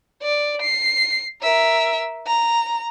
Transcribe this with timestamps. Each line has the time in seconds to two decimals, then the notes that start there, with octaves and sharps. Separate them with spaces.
0.22 D5
0.62 C7
1.42 A#4 E5
2.27 A#5